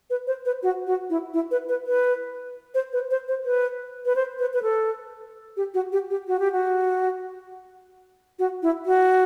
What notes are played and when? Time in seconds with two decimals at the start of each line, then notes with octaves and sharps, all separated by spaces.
0.10 B4
0.27 C5
0.45 B4
0.63 F#4
0.87 F#4
1.10 E4
1.34 E4
1.51 B4
1.69 B4
1.87 B4
2.74 C5
2.93 B4
3.10 C5
3.28 C5
3.45 B4
4.06 B4
4.16 C5
4.39 B4
4.53 B4
4.63 A4
5.57 G4
5.74 F#4
5.92 G4
6.10 G4
6.28 F#4
6.39 G4
6.52 F#4
8.39 F#4
8.63 E4
8.86 F#4